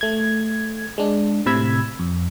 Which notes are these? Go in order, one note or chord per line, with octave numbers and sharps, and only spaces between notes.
A3 G#6
G#3 D4
A2 C3 B5 E6 G#6
F2